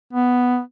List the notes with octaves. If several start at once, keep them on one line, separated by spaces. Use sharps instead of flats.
B3